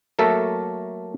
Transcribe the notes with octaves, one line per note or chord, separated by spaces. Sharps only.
F#3 A3 A#3 A4 A#4 E5